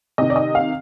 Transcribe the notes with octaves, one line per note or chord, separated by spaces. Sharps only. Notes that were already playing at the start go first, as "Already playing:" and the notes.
C3 D#3 D#5
D5
D#5
F5